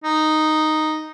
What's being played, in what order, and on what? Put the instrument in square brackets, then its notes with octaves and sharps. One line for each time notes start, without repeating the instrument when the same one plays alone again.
[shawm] D#4